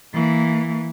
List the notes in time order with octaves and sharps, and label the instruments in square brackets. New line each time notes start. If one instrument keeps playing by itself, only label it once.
[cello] E3 A#3